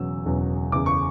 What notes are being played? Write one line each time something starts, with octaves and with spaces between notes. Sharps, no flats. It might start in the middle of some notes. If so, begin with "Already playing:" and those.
Already playing: E1 E2 C#3 F#3 E6
E1 E2 C#3 F#3
F#1 E2 C#3 D6
C#6